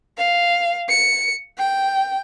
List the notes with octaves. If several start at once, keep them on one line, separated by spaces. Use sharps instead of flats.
F5
C#7
G5